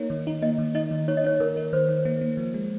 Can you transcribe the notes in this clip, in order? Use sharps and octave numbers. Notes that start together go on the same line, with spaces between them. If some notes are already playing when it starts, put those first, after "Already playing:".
Already playing: A#3 D#4 C#5
D#3
D#4
A#3 D#5
D#3
D#4 D#5
D#3
D#4 C#5
D#5
D#4 C#5
D#3 A#4
D#4
D#3 C5
D#3
A#3
A#3
F3
G#3